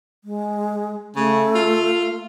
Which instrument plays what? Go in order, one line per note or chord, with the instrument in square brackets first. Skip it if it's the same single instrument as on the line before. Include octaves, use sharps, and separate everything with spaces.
[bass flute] G#3
[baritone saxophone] C#3 [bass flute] A3
[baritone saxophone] F4